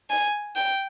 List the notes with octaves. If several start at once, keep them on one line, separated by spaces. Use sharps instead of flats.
G#5
G5